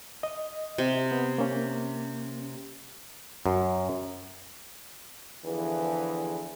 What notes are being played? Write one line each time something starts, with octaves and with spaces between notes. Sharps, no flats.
D#5
C3
B3
A#3 C#4
F#2
E2 D3 E3 F3 G#4 B4